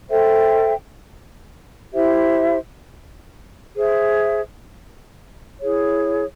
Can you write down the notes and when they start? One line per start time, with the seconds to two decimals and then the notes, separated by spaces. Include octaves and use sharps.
0.09 A4 C5 E5 G5
1.93 E4 G4 C5 E5
3.77 G#4 C5 E5
5.60 E4 G#4 C#5